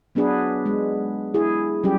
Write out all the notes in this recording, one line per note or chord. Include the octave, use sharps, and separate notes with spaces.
F#3 B3 D4 G#4 B4
G#3
E4 G#4
F#3 G3 C#4 G4